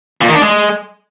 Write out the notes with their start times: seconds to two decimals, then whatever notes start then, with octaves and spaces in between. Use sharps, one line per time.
0.21 A#2
0.28 D#3
0.35 D4
0.42 G#3